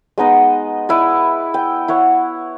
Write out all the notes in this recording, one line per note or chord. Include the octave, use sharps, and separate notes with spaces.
G#3 B3 D#4 D#5
E4 B4 D5
G5
E4 C#5 F#5